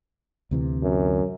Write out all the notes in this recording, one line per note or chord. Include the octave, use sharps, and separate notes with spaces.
D2 C3 E3
F#2